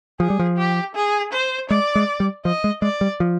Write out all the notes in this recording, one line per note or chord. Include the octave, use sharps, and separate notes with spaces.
F3 G#4
G3
F3
G4
G#4
C5
G#3 D5
G#3
G3
F3 D#5
G#3
G#3 D5
G3
F3